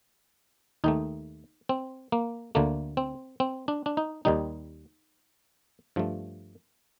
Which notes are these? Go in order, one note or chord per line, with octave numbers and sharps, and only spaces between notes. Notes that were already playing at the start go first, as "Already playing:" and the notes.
D#2 D#3 A3 D#4
C4
A#3
D2 D3 A3 A#3
C4
C4
D4
D4
D#4
D#2 D#3 G3 D#4
G2 F3 A3